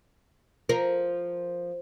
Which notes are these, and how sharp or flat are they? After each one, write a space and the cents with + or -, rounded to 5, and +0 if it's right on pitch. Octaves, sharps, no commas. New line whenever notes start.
F3 +0 A#4 +0